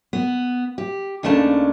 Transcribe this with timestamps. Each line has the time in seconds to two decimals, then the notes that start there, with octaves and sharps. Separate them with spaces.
0.13 B3
0.78 G4
1.23 D#2 C#3 A3 D4 A5